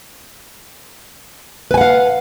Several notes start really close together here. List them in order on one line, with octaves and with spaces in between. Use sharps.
B4 G#5 F#5 F5